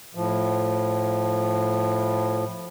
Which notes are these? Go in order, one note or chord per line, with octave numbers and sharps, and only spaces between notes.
A2 F3